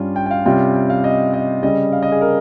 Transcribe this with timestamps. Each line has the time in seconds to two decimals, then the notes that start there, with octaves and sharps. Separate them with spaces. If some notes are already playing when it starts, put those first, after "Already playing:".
Already playing: G2 G3 C#4 F4
0.16 G5
0.26 G5
0.31 F5
0.45 C3 G3 C#4 F4 G5
0.74 G5
0.90 F5
1.04 D#5
1.33 D#5
1.62 C#3 G3 C#4 D#5
1.93 F5
2.03 D#5
2.12 G#4
2.21 A#4